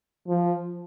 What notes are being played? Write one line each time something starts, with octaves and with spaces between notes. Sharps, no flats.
F3